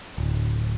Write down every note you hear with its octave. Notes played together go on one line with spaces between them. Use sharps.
D1